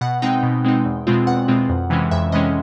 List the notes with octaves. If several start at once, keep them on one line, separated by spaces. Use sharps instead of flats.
B2 F#5
G#3 C4 D#4 G5
B2
G#3 C4 D#4
E2
B2 G#3 C4 F4
E2 F#5
B2 G#3 C4 F4
F2
C3 E3 G#3 C#4
F2 E5
C3 E3 G#3 C#4 D#5